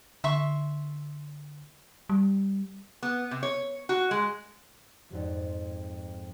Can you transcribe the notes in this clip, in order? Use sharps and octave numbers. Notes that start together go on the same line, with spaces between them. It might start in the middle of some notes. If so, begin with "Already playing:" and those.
D3 E5 C6 C#6
G3
B3
C3
C#5
F#4
G#3
F2 G#2 F3